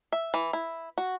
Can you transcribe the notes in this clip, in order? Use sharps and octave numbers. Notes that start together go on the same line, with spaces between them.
E5
E3
E4
F#4